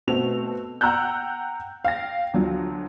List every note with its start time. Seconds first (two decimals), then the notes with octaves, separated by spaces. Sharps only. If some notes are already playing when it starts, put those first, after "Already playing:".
0.07 B2 A3 C4 F#4 F7
0.81 F#5 G5 A#5 E6 F#6 G6
1.85 F5 G5 A#6
2.34 D2 F3 F#3